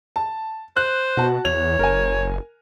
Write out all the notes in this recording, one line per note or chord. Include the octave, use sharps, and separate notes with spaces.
A5
C5 F#6
B2 F#4 A5
E2 C#5 F7
F#1 A#4 G#5